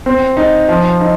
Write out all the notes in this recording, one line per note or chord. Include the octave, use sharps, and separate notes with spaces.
C4
D#4
F3
D#4